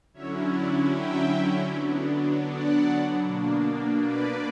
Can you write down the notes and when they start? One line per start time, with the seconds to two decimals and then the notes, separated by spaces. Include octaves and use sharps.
0.13 D3 F#3 C#4 E4 C#5 E5
0.52 D5 F#5
0.90 E5 G5
1.68 D3 F#3 B3 D4
2.45 D5 F#5
3.22 B2 A#3 D4
3.98 B4 D5